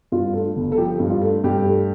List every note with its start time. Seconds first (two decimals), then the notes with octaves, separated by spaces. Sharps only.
0.12 G2 F4
0.34 A3
0.56 G1
0.72 A4
0.78 F3 G4
1.00 G2
1.10 F4
1.22 A3
1.44 G2 G4
1.66 A3